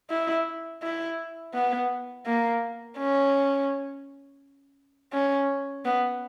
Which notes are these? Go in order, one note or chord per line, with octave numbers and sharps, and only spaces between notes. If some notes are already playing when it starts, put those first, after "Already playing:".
E4
E4
B3
A#3
C#4
C#4
B3